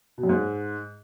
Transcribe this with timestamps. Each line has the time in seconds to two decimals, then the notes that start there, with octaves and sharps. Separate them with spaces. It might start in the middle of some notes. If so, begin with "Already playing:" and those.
0.18 B2
0.23 F#2
0.29 G#2